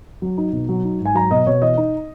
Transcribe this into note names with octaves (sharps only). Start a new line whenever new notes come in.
F#3
D#4
B2
F#3
D#4
G#2
G#5
F#3 A#5
B2 D#5
B2 C#5
E3 D#5
D#4